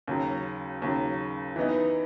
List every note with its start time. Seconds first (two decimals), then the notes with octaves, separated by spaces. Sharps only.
0.07 D#2 C#3 F#3
0.82 D#2 C#3 F#3
1.56 E3 B3 D#4